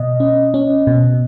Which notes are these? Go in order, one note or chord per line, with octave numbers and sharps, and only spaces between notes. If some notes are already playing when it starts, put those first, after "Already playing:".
Already playing: B2 D#5
C#4
C#4
B2